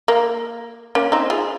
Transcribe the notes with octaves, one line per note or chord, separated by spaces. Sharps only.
A#3
A#3 C#4
C4 D#4
F4 G#4